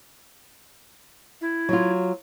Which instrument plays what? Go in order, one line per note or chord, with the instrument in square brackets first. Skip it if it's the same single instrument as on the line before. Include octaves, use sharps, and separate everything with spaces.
[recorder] E4
[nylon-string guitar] F#3 F4